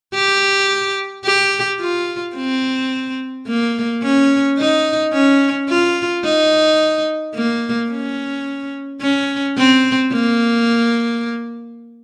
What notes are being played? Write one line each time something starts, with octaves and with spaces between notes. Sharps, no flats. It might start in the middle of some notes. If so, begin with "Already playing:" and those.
G4
G4
F4
C4
A#3
C#4
D#4
C#4
F4
D#4
A#3
C#4
C#4
C4
A#3